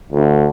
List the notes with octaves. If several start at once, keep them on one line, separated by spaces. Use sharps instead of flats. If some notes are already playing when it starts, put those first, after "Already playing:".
D2